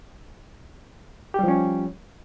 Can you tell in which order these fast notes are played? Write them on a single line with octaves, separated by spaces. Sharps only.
G4 G3 F3 C#4